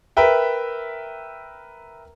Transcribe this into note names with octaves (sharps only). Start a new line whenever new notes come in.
A#4 B4 E5 G5